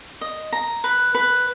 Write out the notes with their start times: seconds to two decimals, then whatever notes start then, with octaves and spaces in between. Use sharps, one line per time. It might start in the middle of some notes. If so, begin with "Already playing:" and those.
0.21 D#5
0.52 A#5
0.84 B4
1.15 B4